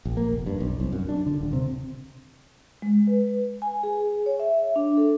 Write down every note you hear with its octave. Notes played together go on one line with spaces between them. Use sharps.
A#1
A#3
F1
G2
B1
C2
F#2
D4
D3
D#1
C3
G#3
B4
G#5
G#4
C#5
E5
D4
A4